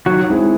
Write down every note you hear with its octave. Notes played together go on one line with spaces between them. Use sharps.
D#3 F#3 F#4
G#3 C4 E4 G#4